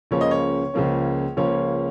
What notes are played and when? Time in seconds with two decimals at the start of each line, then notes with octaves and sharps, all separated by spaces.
0.11 C#2 C#3 F3 A#3 C#4 C#5
0.21 D#5
0.31 C#5
0.74 C#2 C#3 F3 A#3 C#4
1.37 C#2 C#3 F3 A#3 C#4 C#5